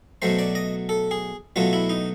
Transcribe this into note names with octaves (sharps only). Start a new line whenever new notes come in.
B2 F#3 A3 C5
D5
D#5
A4
G#4
B2 F#3 A3 F4
E4
D#4